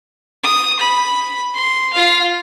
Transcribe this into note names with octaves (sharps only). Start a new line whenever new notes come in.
D#6
B5
C6
F4 F5